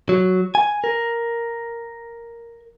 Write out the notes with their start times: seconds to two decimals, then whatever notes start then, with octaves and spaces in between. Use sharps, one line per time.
0.09 F#3
0.55 G#5
0.84 A#4